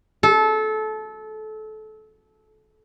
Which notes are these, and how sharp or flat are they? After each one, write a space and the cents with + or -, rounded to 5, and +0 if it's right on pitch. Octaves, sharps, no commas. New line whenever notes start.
A4 -25